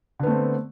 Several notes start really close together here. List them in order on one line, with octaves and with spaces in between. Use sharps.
D3 B3 A3 C4